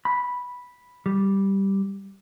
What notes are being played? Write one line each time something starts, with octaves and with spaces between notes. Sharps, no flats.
B5
G3